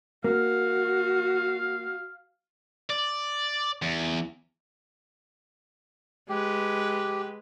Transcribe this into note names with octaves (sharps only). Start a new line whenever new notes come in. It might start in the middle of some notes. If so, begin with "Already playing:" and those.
A#3 F#4 F5
D5
E2
G#3 G4 B4